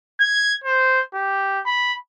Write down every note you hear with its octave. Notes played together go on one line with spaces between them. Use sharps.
G#6
C5
G4
B5